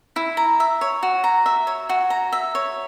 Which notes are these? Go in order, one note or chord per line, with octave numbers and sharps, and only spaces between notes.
E4
A#5
E5
C#5
F#4
A#5
E5
C#5
F#4
A#5
E5
C#5